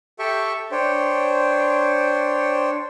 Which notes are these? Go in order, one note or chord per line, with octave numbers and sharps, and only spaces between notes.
G4 A4 E5 G5 C#6
D4 C5 C#5 G5